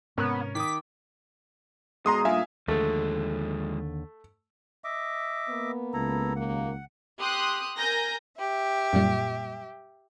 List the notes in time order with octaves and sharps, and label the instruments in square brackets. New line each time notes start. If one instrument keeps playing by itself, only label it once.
[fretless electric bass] G#2 C3 [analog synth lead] B3 [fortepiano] C#4 A#4
[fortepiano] D#3 D#6 [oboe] D6 [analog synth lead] B6
[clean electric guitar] B2 G#3 [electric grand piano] A#5 C6 D#6
[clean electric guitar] G2 A#2 [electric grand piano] E5 F5 G#5
[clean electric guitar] D#2 D3 [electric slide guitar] F3 G#3 [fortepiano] A3
[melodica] D#5 E5 D6
[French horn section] A#3 B3
[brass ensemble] C#2 [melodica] E4 A4 A#5
[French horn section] D#2 A#3 [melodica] F#5
[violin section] G4 C6 D#6 F#6
A#4 G#5 G6 A#6
[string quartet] G4 E5
[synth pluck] F#2 A#2 G3